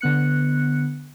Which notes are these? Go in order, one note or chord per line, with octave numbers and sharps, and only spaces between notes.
D3 B3 F#6 C#7